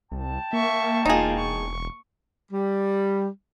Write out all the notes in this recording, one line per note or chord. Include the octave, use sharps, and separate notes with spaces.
C2 G5 A5
A#3 E5 C#6
E1 A#3 D#4 F4 G#4
C#6
G3